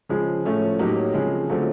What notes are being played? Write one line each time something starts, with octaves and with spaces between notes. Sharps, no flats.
C#3 F3 G#3
A2 F3 A3 C#4
A2 F#3 A#3 D#4 G4
C#3 F3 G#3 C4
D3 F#3 A3 C4 F4